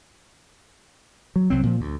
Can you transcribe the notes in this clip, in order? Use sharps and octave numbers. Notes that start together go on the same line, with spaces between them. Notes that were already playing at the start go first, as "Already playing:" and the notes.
F#3
C2 F#3 C4
A#2 F3
D2